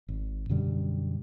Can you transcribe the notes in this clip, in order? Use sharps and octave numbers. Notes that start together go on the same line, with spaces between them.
G#1
F#2 B2 D3 G3